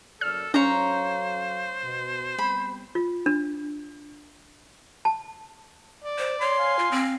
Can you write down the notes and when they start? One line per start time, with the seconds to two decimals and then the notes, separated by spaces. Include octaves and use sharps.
0.21 F#1 A4 D5 F6
0.54 F#3 C#4 A4 C5 C#5 F5 A#5
1.82 B2
2.38 G3 B3 C4 B5
2.95 F4
3.26 D4
5.05 A5
6.04 D5
6.18 C5
6.41 C#5 C6
6.58 F5 G#5
6.79 F4
6.91 C4